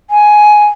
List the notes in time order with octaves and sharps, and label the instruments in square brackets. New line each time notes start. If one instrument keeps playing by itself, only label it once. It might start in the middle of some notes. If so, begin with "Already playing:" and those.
[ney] G#5